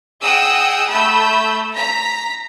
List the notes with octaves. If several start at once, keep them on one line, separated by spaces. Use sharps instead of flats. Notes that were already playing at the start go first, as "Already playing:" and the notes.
G#4 D#5 F#5 G5 D#6 E6
A3 B5 E6 G6
A#5 B6